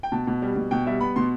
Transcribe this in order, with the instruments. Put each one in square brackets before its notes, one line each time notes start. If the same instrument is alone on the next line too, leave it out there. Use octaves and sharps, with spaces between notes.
[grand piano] G5
B2 A5
B2
G3
B2
B2 G5
G3 E5
B3 B5
B2 C6